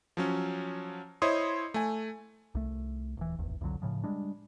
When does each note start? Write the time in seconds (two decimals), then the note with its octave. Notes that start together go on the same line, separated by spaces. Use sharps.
0.17 F3 F#3 C#4
1.22 E4 C5 C#5 D#5 C6 D#6
1.74 A3 G#5
2.55 C2 A3
3.17 D#1 E3
3.39 D1 G#1 E2
3.61 C2 F2 D3 F#3
3.82 A2 C#3 F3
4.04 G3 G#3 D4